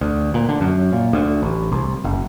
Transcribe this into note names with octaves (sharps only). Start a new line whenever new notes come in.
D2
A#2
D3
F#2
A#2
D2
A1
C2
F#1